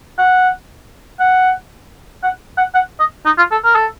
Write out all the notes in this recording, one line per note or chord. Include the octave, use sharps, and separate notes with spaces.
F#5
F#5
F#5
F#5
F#5
D#5
D#4
F4
A4
A#4
A4